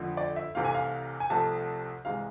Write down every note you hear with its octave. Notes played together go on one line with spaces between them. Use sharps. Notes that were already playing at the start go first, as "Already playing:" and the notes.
Already playing: F2 D3 F3 A3
D5
E5
C2 C3 E3 A3 F5
G#5
F5
G#5
C2 C3 F3 A3 A5
C2 C3 E3 G#3 F5